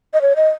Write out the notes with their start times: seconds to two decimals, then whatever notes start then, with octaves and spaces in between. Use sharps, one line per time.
0.14 D#5
0.22 C#5
0.36 D#5